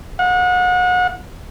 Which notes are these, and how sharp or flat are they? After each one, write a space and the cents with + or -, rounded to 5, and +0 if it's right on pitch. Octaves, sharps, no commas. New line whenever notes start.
F#5 -35